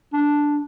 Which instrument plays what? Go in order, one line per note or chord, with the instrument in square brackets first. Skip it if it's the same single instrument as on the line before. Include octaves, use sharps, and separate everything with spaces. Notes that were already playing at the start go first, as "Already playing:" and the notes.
[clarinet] D4